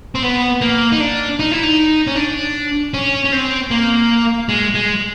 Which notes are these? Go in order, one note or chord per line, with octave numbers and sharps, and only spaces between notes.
C4
B3
A#3
D#4
D4
D#4
E4
D#4
C#4
D4
C#4
C#4
C4
A#3
G#3
G#3